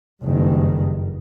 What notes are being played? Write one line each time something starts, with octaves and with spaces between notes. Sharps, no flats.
F#1 G2 D#3